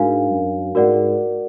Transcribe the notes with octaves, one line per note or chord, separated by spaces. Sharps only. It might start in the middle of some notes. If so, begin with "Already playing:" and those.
Already playing: G#2 D4 F#4 A#4 F5 G#5
F#2
G#2 F#4 A#4 D5 F#5